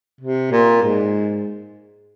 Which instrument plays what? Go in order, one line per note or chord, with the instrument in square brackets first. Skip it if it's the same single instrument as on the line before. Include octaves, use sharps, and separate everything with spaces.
[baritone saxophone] C3
A#2
G#2